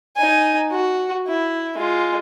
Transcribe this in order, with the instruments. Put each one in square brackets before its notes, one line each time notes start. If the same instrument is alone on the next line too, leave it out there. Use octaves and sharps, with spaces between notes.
[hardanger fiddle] D#4 G#5
F#4
E4
G#3 F4